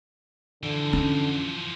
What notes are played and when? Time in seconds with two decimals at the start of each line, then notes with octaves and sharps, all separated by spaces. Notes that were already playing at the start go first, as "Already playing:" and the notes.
0.63 D3 E3 F3
0.93 C#4